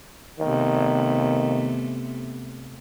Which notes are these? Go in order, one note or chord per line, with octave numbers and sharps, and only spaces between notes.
C3 D#3 A3 B3